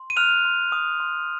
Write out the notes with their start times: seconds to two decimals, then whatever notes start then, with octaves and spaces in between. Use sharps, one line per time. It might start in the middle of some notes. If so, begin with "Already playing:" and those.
Already playing: C6
0.10 D#7
0.16 F6 F#6 F7
0.45 C6
0.72 D#6
1.00 C6